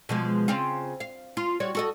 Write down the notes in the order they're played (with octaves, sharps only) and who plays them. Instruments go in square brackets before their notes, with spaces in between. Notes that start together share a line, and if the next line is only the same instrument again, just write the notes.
[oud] B2 F3 G#3
C#3 C4 F4
F5
F4
G3 F#4 C#5
F#4 A4 D#5